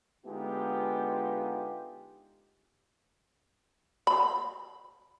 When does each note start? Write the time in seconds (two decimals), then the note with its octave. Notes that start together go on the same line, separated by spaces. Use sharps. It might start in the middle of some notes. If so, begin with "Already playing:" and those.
0.26 D3 G#3 B3 D#4 F4 G4
4.07 B5